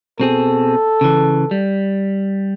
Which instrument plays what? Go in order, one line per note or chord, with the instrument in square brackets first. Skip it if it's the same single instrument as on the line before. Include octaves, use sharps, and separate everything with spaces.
[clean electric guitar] B2 C4 G#4 [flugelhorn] A4
[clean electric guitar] C#3 E3
G3